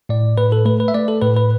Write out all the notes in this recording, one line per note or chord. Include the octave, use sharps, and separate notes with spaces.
A2 D5
A2 B4
A4
A3 B4
B4
E5
A3 D5
A4
A2 B4
B4